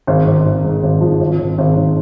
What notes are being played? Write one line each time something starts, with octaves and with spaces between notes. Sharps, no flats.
G#1
G#1
G#1
G#2
G#1
F3
G#1
G#1
G#1
G#1